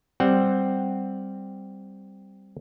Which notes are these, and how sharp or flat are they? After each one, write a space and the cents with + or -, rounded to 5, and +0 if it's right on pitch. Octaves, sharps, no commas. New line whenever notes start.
G3 +0 C4 +0 F#5 +0